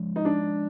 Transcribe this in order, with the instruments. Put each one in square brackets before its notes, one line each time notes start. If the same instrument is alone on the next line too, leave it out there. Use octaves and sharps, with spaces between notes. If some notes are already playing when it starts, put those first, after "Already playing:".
Already playing: [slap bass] F3 G#3 C#4
[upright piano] D#4
D4